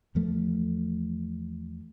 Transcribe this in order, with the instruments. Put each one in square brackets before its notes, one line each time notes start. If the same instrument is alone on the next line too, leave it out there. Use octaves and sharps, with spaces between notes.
[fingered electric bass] E2 F3 A3